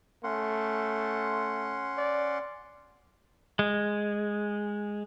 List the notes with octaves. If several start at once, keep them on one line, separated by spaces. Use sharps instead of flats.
A3 C#4 F#5 C6
D5
G#3